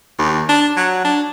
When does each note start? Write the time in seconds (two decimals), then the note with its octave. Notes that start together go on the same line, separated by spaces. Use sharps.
0.19 D#2
0.49 D4
0.77 F#3
1.05 D4